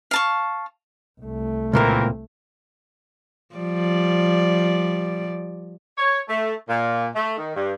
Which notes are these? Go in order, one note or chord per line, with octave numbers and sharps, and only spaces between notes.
F5 A5 C#6
C2 A3
C#2 A#2 E3 A#3 C4 A#4
F3 G3 D5
C#5
A3
A#2
A3
D#3
G2